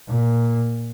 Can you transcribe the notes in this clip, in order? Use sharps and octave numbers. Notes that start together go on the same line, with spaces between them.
A#2